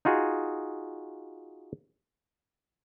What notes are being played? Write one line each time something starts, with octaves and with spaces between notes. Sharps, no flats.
D#4 F4 F#4 G#4